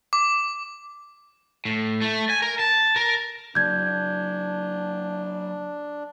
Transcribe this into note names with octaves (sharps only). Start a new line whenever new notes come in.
D6
A2
A3
G#5
A#4
A5
A#4
C#3 F#3 D4 G6 G#6